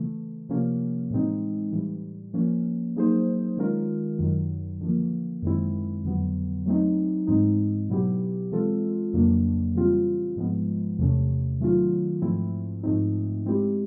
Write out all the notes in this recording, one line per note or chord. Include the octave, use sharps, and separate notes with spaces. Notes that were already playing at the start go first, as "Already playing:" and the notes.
Already playing: C#3 E3 A3
C3 F3 A#3 C#4
A2 E3 G#3 C4 D#4
A2 E3 G3
F3 A#3 C#4
F#3 A#3 D#4 G#4 C5
D#3 G#3 C#4 F4 A#4
F#2 D#3 F#3
D3 F3 A#3
F#2 D#3 G#3 C4 E4
F2 D3 F#3 B3
F#3 A3 C4 D#4
G#2 E3 G#3 C4 D#4
B2 F#3 B3 E4 G4
E3 G#3 C4 F4 A4
F2 C#3 F#3 A#3 D4
C#3 E3 G3 C4 F4
G#2 F3 G#3 B3
E2 C3 E3 A3 C#4
D#3 F#3 A3 C#4 F4
G#2 F3 A3 C4 E4
G#2 F3 A3 C4 D#4
G#3 C4 E4 G4